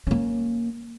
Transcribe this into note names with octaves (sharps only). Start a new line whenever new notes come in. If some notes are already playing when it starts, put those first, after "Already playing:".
A#3 C#4